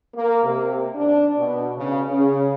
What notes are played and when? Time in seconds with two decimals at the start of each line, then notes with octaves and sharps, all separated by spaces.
0.15 A#3
0.44 C3
0.95 D4
1.37 B2
1.76 C#3
2.09 C#3